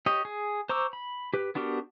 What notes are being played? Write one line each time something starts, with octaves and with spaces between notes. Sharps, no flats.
G4 C#5 D#5
G#4
C5 A#5 C#6 D6 E6
B5
G4 B4
B3 D4 F#4 G4 A#4